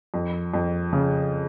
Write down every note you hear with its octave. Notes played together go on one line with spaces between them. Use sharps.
F2
F2
C#3